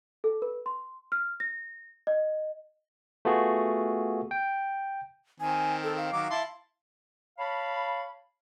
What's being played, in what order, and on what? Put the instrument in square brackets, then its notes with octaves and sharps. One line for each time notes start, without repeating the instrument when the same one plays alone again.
[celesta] A4
B4
C6
F6
A#6
D#5
[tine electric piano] A3 B3 F4 F#4 G#4
G5
[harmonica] D#3 C4 [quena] G#5
[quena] A4
F5
[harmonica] D#3 F#3 D6
E4 A5 C6
[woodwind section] C#5 F5 A5 B5